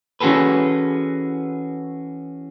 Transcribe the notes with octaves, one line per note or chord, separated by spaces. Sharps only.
E3 C#4 F#4 G#4 A4 B4